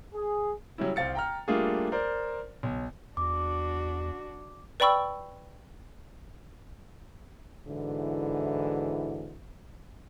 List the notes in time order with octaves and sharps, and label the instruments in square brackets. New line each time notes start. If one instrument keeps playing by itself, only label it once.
[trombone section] G#4
[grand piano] F#3 G3 C#4 E4
C2 C4 F5 A6 C#7
G5 A#5 F6
G3 A3 A#3 D4 F4 G#4
A#4 C5 D5
B1
[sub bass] E2 [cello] D4 F#4 [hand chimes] D6
[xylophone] B4 D5 G5 B5 C#6 E6
[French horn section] G#2 D3 E3 E4 F#4